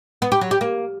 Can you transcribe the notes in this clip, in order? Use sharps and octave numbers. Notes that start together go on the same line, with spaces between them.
B3
G4
F#3
G4
A#3